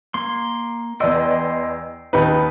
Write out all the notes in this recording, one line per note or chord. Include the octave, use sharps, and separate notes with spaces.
A#3 C6
E2 D5 D#5 G5 C6 E6
D#2 D#4 B4